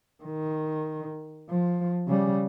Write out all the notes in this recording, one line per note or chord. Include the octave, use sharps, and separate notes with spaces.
D#3
F3
C#3 G3